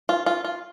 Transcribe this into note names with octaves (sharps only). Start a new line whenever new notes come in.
F4
F4
F4